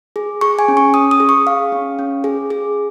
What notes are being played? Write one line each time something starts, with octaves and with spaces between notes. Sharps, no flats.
G#4
G#4 C#6
G#5
C#4
C#6
C#4 D#6
D#6
G#4
C#6
G#4 F5
C#4
C#4
G#4
G#4